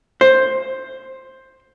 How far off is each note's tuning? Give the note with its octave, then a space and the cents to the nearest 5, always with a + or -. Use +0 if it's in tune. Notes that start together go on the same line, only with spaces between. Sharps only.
C5 +10